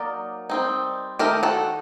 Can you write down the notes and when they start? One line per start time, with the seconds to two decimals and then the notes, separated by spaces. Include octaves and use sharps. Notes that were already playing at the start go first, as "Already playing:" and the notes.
Already playing: F#3 A#3 D#4 A#4 D5
0.50 G3 C4 D#4
1.19 D#3 A3 D#4 G4 A#4
1.43 F#4 A4